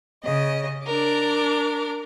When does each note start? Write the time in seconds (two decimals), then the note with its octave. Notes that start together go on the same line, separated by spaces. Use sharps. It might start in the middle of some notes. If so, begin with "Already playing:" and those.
0.24 C#3 D#5
0.85 D4 A#4 D6